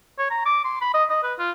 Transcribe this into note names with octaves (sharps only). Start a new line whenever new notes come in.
C#5
A#5
D6
C6
B5
D#5
D#5
B4
F4